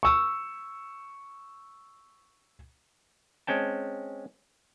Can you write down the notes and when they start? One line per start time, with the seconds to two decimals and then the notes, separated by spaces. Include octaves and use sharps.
0.03 C#6 E6
3.47 G#3 C4 C#4 G5 A5